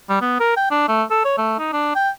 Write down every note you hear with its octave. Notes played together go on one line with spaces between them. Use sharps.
G3
B3
A#4
G5
D4
A3
A4
C#5
A3
D#4
D4
G5